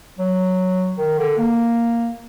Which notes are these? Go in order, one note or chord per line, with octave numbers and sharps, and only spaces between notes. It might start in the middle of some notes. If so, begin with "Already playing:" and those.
F#3
D#3
D3
A#3